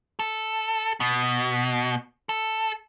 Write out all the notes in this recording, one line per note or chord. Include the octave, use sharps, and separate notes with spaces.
A4
B2
A4